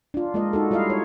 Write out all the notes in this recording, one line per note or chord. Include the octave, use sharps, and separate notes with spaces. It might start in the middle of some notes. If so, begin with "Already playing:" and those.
D4 F4
G#3 A#3 F4 A#4 D#5
D#4 F#4 A4
G3 E4 F4 D#5 F5
C#5